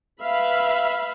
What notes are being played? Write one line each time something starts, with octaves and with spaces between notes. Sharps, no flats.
B4 E5 F5 B5